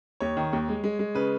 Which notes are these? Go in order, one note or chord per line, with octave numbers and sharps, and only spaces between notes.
D#2 C#5
D#3
D#2
G#3
G#3
G#3
C#3 B4